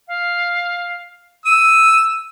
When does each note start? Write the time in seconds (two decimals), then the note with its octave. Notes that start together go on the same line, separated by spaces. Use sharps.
0.07 F5
1.45 E6 D#7